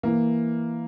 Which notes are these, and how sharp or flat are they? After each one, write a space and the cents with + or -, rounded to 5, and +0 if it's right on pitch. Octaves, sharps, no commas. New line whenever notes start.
E3 +0 A#3 +0